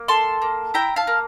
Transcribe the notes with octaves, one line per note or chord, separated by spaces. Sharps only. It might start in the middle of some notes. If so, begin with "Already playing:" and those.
Already playing: A#3
A4 A5 C6
A#3
E4 G5 A#5
F5 A5
A#3